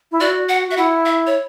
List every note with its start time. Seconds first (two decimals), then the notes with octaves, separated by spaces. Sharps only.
0.12 E4
0.21 F#4 D5
0.49 F#5
0.67 F#4 E5
0.77 E4 F#5
1.06 E5
1.27 C#5